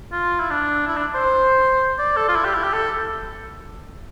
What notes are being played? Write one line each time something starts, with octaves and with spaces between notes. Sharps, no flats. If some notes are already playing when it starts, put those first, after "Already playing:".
F4
E4
D4
E4
D4
C5
D5
A4
F4
E4
G4
E4
G4
A4